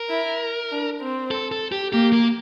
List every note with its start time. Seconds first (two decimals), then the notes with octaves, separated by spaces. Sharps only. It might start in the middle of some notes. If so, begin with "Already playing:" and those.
Already playing: A#4
0.10 E4
0.70 D4
1.01 C4
1.31 A4
1.52 A4
1.72 G4
1.92 A#3 G4
2.13 A#3